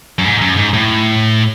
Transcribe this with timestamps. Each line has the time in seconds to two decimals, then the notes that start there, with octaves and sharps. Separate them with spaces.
0.19 F#2
0.24 G#2
0.41 F#2
0.57 G#2
0.73 A2